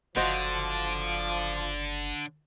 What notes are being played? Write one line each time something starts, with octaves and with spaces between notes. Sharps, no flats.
F#1 D3 F3 F#4 C5 D#5